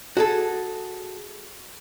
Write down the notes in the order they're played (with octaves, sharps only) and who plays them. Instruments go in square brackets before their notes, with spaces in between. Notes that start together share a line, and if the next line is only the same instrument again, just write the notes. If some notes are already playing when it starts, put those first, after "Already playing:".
[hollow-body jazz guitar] F#4 G#4 A4